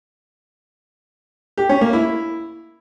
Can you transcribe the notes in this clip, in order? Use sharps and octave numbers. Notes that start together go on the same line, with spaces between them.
G4
C#4
A#3
E4